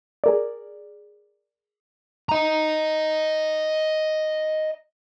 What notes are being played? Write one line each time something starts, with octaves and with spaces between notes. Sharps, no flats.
G#4 A#4 D5
D#5 A#5